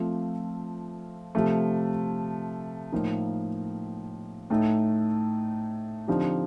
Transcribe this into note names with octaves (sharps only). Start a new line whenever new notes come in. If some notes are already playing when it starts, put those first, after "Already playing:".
Already playing: F3 A3 C4 F4
C3 F3 A3
A2 F3 A#3 D#4
A2 A3 D#4
D3 F3 C4 D#4 G4